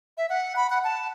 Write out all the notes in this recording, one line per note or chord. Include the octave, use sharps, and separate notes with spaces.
E5
F#5
B5
F#5
A5